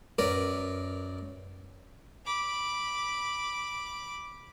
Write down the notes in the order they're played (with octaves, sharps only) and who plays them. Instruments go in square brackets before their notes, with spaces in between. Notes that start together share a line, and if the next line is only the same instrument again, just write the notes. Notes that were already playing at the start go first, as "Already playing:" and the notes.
[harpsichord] F#2 A#4 B4 D5
[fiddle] B5 D6